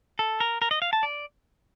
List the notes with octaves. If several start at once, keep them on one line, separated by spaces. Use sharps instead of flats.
A4
A#4
A#4
D#5
F5
A5
D5